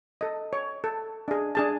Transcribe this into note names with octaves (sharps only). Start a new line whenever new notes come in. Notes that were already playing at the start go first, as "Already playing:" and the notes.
A4 D#5
C#5
A4
D4 G#4
D4 G#4 A5